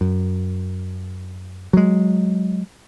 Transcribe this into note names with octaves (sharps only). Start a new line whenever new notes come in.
F#2
F#3 G#3